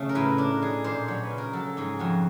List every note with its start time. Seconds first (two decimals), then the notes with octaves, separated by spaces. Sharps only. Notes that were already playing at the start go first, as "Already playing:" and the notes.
Already playing: C#3 A3
0.09 A#4
0.15 A2 B4
0.38 D4 A#4
0.62 D#4 G#4
0.84 A#2 C5
1.08 F#3 C#5
1.23 B4
1.30 C#3
1.38 A#4
1.53 F#3 A4
1.77 G#2 G#4
1.99 F2 F#4